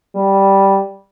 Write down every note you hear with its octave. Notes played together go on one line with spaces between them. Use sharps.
G3